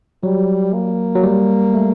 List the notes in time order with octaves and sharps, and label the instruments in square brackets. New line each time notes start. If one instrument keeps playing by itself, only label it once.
[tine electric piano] F#3 [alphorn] G3
[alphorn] A#3
[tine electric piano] F#3
G3
A3